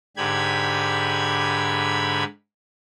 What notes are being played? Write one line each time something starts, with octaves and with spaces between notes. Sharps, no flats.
G#2 D3 G4 B5 G#6